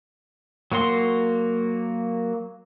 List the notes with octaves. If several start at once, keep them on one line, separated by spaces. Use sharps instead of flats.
F#3 A#3 F#4 C6